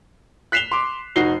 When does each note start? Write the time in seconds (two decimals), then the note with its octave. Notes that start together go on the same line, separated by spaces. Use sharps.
0.52 F#6 B6 C7 E7 F7 G7
0.72 C6 D6
1.16 F1 D#4 F#4 C7 G7